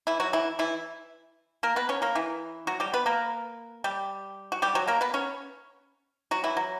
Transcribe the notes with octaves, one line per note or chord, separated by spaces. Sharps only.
E3 E4
F#3 F#4
E3 E4
E3 E4
A#3 A#4
B3 B4
C#4 C#5
A#3 A#4
E3 E4
F#3 F#4
G3 G4
B3 B4
A#3 A#4
G3 G4
F#4
G3 G4
F#3 F#4
A#3 A#4
B3 B4
C#4 C#5
F#3 F#4
E3 E4
F#3